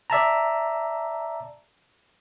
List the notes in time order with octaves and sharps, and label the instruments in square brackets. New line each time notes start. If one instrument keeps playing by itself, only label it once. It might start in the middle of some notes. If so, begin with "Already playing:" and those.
[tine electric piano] D5 E5 A5 A#5